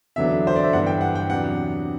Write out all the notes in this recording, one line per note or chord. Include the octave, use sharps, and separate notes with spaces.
E2 D3 F#3 B3 D4 E5
C5
D5
E5
G2 E3 B3 D4 F#5
G5
F#5
G5
E2 C3 F#3 B3 D4 F#5